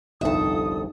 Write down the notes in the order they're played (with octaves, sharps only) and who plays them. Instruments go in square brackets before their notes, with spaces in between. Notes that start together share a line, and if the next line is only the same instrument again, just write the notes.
[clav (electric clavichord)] G1 C2 F2 [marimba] D#4 [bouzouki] A4 E5 [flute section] D#6